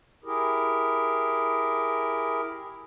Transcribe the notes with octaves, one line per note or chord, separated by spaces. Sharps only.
E4 G4 G#4 A#4